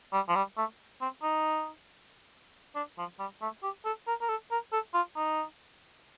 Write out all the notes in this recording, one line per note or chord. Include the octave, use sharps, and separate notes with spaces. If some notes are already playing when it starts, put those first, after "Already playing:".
G3
F3
G3
A3
C4
D#4
D4
F3
G3
A3
G4
A4
A#4
A#4
A4
A#4
A4
F4
D#4